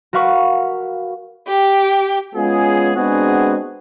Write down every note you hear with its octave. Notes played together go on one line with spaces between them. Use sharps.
F#4 A#4 B4 F5 C#6
G4
G#3 B3 C#4 F4 G#4
G#3 B3 C4 D4 F#4 G#4